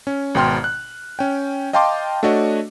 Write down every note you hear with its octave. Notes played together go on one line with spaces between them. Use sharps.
C#4
G#1 B2 G5 C6 F6
F#6
C#4 G5
D#5 F5 G5 A5 C6 D6
A3 D4 F#4 C#5 D#5